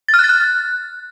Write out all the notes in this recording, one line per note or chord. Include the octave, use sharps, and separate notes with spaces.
A6
F6
F#6
A6
F#6